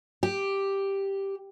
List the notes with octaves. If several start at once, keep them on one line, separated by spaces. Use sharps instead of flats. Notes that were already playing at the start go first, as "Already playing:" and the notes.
G4